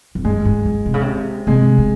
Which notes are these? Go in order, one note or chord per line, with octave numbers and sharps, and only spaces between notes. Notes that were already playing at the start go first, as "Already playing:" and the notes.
F2
G2 G#3
G#2
G#2
C3
C#3
C3
C3 G#3
C3